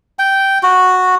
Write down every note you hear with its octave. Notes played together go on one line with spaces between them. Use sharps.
G5
F#4